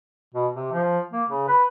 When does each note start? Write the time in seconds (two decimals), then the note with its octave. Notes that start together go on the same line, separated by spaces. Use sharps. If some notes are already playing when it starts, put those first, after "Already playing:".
0.35 B2
0.55 C3
0.72 F3
1.12 A#3
1.29 C#3
1.48 B4